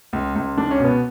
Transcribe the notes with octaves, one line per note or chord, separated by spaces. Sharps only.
C#2
C#2
C#2 D4
C#4
B2
B3